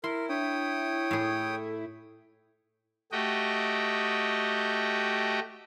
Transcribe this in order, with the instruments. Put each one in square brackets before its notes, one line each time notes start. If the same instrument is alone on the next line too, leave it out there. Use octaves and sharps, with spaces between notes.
[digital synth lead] E4 [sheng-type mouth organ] A#4 [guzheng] C6
[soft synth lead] D4 [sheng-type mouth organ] C#5 G5 D#6
[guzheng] A2 G#4 [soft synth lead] A4
[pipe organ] A3 F#4 G4 D#5 G5